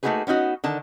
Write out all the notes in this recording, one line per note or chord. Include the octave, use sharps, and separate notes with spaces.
A3 A#3 D#4 F#4 G#4 B4
B3 C#4 D#4 F#4
D3 D#3 A5